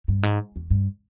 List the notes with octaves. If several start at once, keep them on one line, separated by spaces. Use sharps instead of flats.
G2
G#2
E2
G2